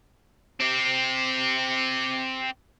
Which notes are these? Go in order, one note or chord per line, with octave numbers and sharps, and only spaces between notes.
C4 G4